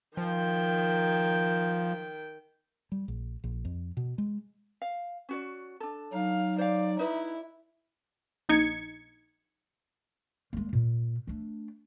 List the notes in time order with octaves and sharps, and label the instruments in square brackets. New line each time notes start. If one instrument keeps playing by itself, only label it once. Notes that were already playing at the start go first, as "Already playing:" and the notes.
[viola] D#3 G5 [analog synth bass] F3
[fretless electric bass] G3
A#1
A#1
F2
B2
G#3
[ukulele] F5
C#4 F#4 D5
D4 A4
[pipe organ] F#3 D#4 [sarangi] F5
[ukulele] C5 F5 [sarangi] D5
[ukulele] D#4 B4 D#5 [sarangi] E4
[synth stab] A#1 D#4 G#6 C#7
[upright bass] G#3 A#3
A#2
A3 D4